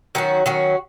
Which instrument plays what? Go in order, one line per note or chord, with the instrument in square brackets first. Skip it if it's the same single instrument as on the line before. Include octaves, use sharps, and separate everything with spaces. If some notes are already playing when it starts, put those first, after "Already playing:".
[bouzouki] D#3 F#3 C#4 F#4
D#3 F#3 C#4 F#4